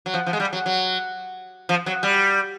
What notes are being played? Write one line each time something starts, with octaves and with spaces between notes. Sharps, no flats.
F#3
F3
F3
G#3
G3
F#3
F#3
F3
F#3
G3